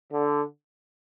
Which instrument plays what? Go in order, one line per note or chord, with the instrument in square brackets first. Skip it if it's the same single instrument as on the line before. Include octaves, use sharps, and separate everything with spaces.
[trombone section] D3